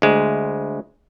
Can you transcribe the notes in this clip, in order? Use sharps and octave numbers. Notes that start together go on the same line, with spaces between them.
D2 G#3